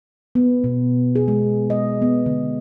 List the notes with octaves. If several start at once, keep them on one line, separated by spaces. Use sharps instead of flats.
B3
B2
G#4
G#3
D#5
B3
D3